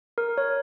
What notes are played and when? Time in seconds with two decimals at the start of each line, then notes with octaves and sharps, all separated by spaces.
0.18 A#4
0.38 C#5